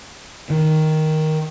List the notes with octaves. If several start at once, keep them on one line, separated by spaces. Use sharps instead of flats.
D#3